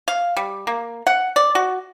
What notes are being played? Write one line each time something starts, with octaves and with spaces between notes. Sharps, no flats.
F5
G3
A#3
F#5
D5
F#4